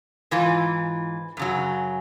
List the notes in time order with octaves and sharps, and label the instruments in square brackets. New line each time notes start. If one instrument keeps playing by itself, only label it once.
[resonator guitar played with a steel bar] G#2 E3 F4
F#2 C#3 F#3